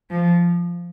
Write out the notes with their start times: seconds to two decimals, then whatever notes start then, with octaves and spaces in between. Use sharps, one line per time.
0.11 F3